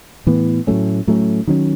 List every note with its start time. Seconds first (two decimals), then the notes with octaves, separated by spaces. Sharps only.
0.26 A2 E3 B3
0.67 A2 F#3 A3 C#4
1.07 A2 F#3 A3 C#4
1.47 D#3 F#3 C#4